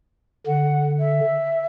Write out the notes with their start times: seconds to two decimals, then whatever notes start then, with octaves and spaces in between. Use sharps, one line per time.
0.46 D3 F#5
1.00 E5